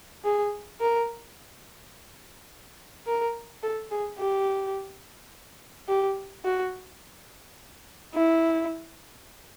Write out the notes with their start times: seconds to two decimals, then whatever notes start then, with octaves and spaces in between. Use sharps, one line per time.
0.24 G#4
0.81 A#4
3.07 A#4
3.63 A4
3.91 G#4
4.20 G4
5.88 G4
6.45 F#4
8.14 E4